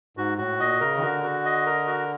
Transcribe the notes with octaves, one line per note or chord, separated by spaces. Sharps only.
G#2 F#4
A2 F#4
A#2 D#5
C#3 A#4
D#3
D3 F#4
F#4
D#5
A#4
F#4